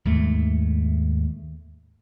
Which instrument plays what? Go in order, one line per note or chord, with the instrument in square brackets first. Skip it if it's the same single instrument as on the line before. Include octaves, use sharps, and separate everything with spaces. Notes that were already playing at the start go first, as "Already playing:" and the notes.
[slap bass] D#2 G#2 A3